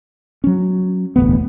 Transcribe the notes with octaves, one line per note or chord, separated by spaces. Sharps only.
F#3 C#4
E1 A1 D2 B3